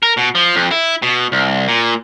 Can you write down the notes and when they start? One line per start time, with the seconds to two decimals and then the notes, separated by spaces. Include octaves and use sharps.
0.03 A#4
0.17 B2
0.35 F3
0.56 F2
0.71 E4
1.02 B2
1.32 C2
1.68 A#2